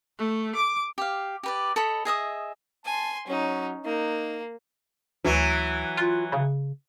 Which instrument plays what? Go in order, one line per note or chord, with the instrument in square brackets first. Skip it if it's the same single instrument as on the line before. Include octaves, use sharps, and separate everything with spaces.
[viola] A3
D6
[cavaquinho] G4 F5
G4 B4 D5
A4 C#5 D#5 B5
G#4 D#5 E5 D#6
[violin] G#5 C6 [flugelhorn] A5
[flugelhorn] F#3 [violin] C#4 D#4
[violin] A#3 [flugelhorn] D#4
[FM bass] D2 [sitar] E3 F#3
[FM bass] F4
C#3